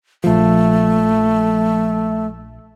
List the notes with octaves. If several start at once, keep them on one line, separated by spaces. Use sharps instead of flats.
A#1 F3 A3